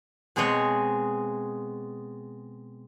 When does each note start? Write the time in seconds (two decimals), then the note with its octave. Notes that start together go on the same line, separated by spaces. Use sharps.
0.36 B2 G#3 C4 G#4 C#5 D#5